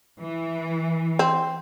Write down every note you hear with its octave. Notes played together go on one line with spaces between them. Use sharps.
E3
C4